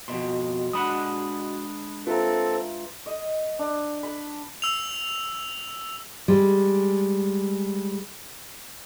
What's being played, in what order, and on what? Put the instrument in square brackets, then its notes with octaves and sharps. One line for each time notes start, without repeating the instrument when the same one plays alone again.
[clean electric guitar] F2 B2 [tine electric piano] F#4 D#5 C6
[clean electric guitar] G#3 D4 F#5 [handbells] B5 D#6
[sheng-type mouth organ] C4 A4 [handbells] F4 [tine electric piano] B4 E5 A#5
[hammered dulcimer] D#5
D4
B5
[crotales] E6 F7
[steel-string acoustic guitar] G3 G#3